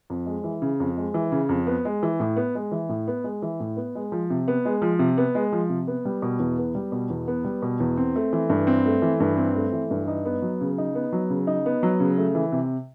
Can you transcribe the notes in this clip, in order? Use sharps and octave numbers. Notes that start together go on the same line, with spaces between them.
F2
G#3
E3
C#3
F2
G#3
E3
C#3
F2
B3
G#3
E3
A2
B3
G#3
E3
A2
B3
G#3
E3
A2
B3
G#3
F3
C3
B3
G#3
F3
C3
B3
G#3
F3
C3
B3
G3
B2
E2
B3
G3
B2
E2
B3
G3
B2
E2
C4
A3
E3
G2
C4
A3
E3
G2
C4
A3
E3
G2
D#4
B3
F#3
C#3
D#4
B3
F#3
C#3
D#4
B3
F#3
C#3
A3
E3
C3